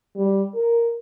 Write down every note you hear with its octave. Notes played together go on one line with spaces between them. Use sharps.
G3
A#4